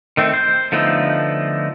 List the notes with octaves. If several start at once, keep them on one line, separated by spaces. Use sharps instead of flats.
D#3 A3 C4
C5
D3 F3 A3 B3 D#4